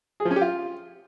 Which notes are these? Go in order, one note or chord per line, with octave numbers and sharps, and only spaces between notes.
G#4
F3
C#4
G4
F4